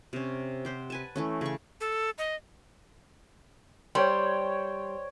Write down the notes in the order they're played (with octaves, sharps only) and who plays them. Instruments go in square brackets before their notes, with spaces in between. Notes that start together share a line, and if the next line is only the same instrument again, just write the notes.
[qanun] C3 C#4
G4 C5 F#5
B4 G#5 A5
E3 A3 C#4
C#3 C#6
[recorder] A4
D#5
[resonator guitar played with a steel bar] G3 [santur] C5 C#5 G5